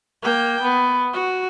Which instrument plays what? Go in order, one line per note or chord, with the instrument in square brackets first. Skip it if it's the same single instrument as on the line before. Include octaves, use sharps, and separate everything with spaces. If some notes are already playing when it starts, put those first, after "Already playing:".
[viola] A#3 G5
B3
F#4